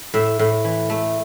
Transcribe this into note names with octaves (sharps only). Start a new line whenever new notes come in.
A2 E5
A2
E3
A3